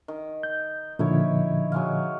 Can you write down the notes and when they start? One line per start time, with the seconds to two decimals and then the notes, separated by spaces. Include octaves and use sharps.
0.08 D#3
0.43 G6
0.99 A#2 D3 D#3 F3 E4 C#5
1.72 F#3 G#3 F5